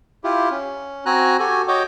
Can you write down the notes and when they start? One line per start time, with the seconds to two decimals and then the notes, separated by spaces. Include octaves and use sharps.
0.24 E4 F4 G4
0.51 C#4
1.06 C4 F#4 G#5 A#5 F#6
1.39 F#4 G4 A4 G#5
1.68 F#4 C#5 D#5 G5 D6